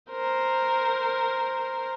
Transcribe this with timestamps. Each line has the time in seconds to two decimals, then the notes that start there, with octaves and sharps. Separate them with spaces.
0.12 A#4 C5